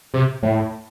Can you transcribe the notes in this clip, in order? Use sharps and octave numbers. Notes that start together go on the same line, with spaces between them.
C3
A2